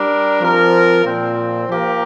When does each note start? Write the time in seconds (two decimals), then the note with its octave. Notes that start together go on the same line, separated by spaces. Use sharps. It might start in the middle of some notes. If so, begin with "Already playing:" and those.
Already playing: G3 D4 A#4
0.40 F3 C4 A#4
1.05 A#2 F3 C4
1.69 F3 A#3 G4 A#4